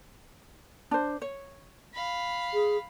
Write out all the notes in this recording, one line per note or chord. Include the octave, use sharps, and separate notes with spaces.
D4 C5
C#5
F5 B5
G#4